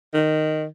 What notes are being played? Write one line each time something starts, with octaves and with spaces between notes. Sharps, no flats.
D#3